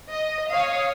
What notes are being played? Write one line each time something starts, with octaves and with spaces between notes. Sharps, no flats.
D#5
C#5 F5 D#6